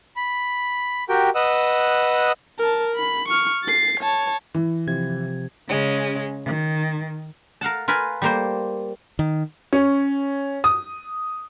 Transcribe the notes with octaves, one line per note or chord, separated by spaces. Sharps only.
B5
F#4 G4 A#4 G5
B4 D#5 F#5 D#6 E6
A#4 A5
B5
C#6 F6
A6 C7
C#5 A5
E3
C3 F3 G#6
C#3 G#3 C#4
D#3
A#4 F5 F#5 A5
F4 A#4 B4 G#5
G3 A#3 C5
D#3
C#4
D#6